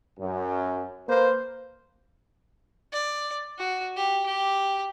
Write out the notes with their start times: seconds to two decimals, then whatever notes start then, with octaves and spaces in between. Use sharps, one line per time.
0.19 F#2
1.08 A#3 B4 C5
2.92 D5
3.58 F#4
3.96 G4
4.26 G4